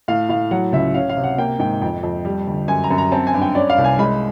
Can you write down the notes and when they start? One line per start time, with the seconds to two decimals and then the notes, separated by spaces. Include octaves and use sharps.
0.08 A2 F5
0.29 A2 F5
0.51 F#3 F#5
0.73 C#2 E5
0.94 C#4 F5
1.09 F5
1.17 C3
1.24 F#5
1.38 A#3 G5
1.59 G#2 G5
1.81 F2 G5
2.03 F2
2.25 G3
2.47 D2
2.68 F#2 G#5
2.84 A#5
2.90 F#2
2.98 A#5
3.12 C4 A5
3.27 G#5
3.34 G2
3.42 G5
3.55 C#4 D5
3.70 F5
3.78 C2
3.84 G#5
3.99 G#3 B5